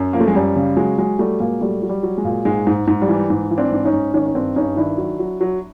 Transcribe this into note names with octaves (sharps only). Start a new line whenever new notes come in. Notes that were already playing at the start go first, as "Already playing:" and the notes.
Already playing: F#2
F3 A#3
A3
G#3
F#2 G3
C#3
F#3 G#3
F#3 G#3
F#3 G3 A3
A#2 G#3 A#3
F#3 G3 A3
F#3
G3
F#3
G#3
A#2
G#2 G#3
G#2
G#2
G3
E3
G#2
E3
C4 D4
G#2
C#4 D#4
G#2
D#3 C#4 D#4
C#4
G2 C4 D4
G2 C#4 D#4
D#3 D4 E4
F#3
F#3
F#3